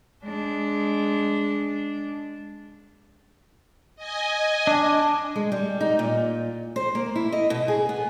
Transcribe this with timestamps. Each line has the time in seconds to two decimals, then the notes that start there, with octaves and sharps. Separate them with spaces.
0.24 G#3 D4
3.96 D#5 G#5
4.67 D4
5.36 G#3
5.52 G3
5.81 D#4
5.99 A#2
6.76 C5
6.95 A#3
7.16 E4
7.32 D#5
7.50 B2
7.68 G#4
7.89 B3